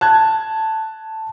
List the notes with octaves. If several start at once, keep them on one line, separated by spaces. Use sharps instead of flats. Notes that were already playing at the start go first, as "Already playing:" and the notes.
A5 F#6 G#6